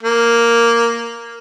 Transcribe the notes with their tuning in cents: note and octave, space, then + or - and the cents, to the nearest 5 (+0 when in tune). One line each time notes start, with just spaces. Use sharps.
A#3 +0